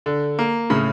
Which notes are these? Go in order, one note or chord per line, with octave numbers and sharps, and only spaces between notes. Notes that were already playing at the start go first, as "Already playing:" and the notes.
D3
A#3
A2 C#3